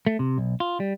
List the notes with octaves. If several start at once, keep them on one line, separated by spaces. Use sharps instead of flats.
A3
C3
B1
F4
G3